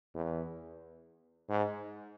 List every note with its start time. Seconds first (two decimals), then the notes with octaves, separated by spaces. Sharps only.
0.15 E2
1.49 G#2